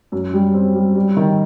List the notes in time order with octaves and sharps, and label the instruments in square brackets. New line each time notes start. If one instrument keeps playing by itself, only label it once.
[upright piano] F#2
G3
C4
G3
G3
D#3